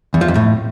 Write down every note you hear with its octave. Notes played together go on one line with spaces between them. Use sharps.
E2
F3
F2
A2